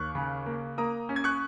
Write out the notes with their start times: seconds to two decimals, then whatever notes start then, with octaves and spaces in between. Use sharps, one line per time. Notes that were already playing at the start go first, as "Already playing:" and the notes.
Already playing: D#2 C#6 F#6
0.15 C#3
0.46 A#3
0.78 A#3 A#5 D#6
1.09 C#4
1.16 G#6
1.24 C#6 F#6